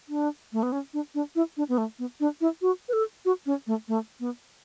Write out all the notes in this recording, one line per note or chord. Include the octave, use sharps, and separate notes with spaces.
D4
A3
B3
C#4
D4
D4
E4
D4
B3
A3
B3
D4
E4
F#4
B4
A4
F#4
C#4
A3
A3
B3